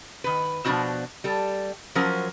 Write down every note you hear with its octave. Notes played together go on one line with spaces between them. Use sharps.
D#3 B4
B2 F3 D4 E4 F#4 C5
G3 A4
F3 F#3 C#4 A#4 C5